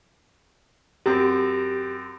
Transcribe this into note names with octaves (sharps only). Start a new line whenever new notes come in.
F#2 C4 G4